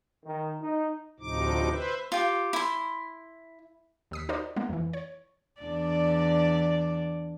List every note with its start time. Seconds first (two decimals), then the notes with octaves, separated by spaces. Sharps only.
0.24 D#3
0.62 D#4
1.20 D2 A2 C3 F3 D#4 D6
1.71 B4 C5 E5
2.12 F4 G4
2.53 E4 C6
4.11 D#2 D#6 B6
4.29 D#4 F#4 A#4 C5 D5 D#5
4.56 G#3 A#3 B3
4.69 F2 E3
4.93 C#5
5.61 E2 D4 D5